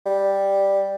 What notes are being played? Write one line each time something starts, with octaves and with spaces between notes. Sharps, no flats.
G3